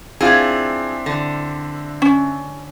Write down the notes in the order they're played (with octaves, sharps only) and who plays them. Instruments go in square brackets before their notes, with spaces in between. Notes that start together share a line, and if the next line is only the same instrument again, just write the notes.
[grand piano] C4 D4 E4 [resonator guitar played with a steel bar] F4 G#4
[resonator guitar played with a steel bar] D3
[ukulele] C#4